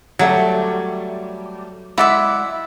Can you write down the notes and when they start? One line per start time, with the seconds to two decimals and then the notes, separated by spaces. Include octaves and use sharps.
0.19 F#3 G3 A3
1.98 G#3 E4 D5 E5 F#5